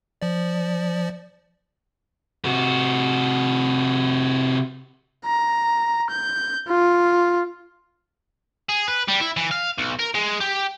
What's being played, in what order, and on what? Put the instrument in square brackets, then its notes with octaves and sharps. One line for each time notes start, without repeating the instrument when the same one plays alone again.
[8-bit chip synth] F3 D5
[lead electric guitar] C3 F#4
[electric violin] A#5
G6
F4
[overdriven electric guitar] G#4
B4
G3
E4
E3
F5
B1
A#4
G#3
G4